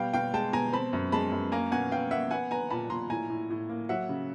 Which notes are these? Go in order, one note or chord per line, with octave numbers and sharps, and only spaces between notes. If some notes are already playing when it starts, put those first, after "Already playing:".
Already playing: B2 G3 F5 G5
B2 F5 G5
G#3 G5 A5
B2 G#5 A#5
C4 A5 B5
F#2
G#3 A5 B5
F#2
A#3 G#5 A#5
B2 F#5 G#5
B2 F5 G5
A#3 E5 F#5
B3 F#5 G#5
B3 G#5 A#5
A#2 A5 B5
A#2 A#5 C6
A2 G#5 A#5
A2
A2
A#3
F#3 E5 F#5
C#3